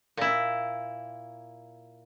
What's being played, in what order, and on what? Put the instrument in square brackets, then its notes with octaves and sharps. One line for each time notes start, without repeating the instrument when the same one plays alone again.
[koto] A#2 E4